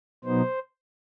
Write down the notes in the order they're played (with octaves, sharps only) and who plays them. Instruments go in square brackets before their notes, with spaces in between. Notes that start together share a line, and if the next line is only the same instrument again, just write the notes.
[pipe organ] B2 F#3 B3 D#4 C5